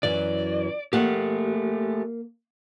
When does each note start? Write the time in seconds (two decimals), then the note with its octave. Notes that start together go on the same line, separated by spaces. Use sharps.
0.03 F#2 E3 F#3 D5
0.93 A3 A#3 G4 F#5